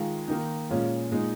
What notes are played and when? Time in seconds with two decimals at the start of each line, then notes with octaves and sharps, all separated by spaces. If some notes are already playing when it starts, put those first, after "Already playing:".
Already playing: D#3 G#3 F4
0.28 D#3 A#3 D#4
0.70 A#2 G#3 C#4 F4
1.11 A#2 G#3 D#4